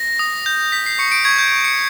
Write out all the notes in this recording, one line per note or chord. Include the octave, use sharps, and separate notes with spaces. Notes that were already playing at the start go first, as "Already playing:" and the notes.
Already playing: A#6
D#6
G6
G6 B6
C7
C#6 C#7
D7
C#6 G#6
G6
C#6
C#7